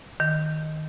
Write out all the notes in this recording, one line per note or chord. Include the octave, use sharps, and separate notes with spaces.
D#3